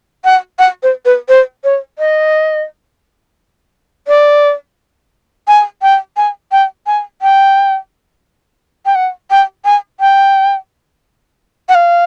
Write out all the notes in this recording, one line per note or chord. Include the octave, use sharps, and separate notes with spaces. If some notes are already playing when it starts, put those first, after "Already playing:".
F#5
F#5
C5
B4
C5
C#5
D#5
D5
G#5
G5
G#5
G5
G#5
G5
G5
F#5
G5
G#5
G5
F#5
F5